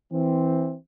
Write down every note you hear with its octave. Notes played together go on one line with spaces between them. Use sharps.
E3 C4